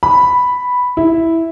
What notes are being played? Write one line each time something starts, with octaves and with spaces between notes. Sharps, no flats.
B5
E4